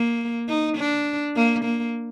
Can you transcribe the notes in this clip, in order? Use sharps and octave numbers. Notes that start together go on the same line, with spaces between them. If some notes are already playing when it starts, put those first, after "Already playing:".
Already playing: A#3
D#4
D4
A#3
A#3